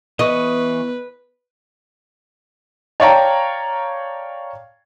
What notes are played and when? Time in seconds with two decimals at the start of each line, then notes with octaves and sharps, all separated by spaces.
0.19 E3 B3 B4 D#5 C#6
3.00 C#5 D5 F5 G5 A5 A#5